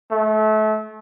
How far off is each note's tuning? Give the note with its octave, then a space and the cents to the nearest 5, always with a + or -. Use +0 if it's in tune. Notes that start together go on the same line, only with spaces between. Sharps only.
A3 -30